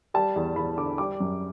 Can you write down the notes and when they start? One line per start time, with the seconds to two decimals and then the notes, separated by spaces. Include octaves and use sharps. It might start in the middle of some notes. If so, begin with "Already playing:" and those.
0.14 G3 A5
0.36 E2
0.56 E2 B5
0.77 D3 D6
0.98 G3 D6
1.20 F#2